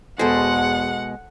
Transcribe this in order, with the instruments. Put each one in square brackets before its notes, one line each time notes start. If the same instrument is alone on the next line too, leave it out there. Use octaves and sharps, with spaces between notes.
[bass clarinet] E2 [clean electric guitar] B2 G#3 [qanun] A4 C5 [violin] F#5